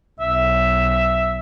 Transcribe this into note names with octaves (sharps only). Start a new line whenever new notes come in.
B1 E5